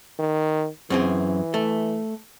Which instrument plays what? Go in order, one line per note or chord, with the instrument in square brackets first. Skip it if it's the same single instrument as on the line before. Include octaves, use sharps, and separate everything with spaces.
[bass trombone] D#3
[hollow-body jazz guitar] F#2 C4 G#4 [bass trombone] E3
[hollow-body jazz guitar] A3